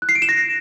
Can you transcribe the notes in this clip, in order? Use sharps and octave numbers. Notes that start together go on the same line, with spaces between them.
F#6
C7
D7
E7
A#6